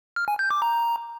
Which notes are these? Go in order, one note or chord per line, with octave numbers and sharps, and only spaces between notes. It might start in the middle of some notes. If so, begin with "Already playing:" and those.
F6
G#5
G6
D6
A#5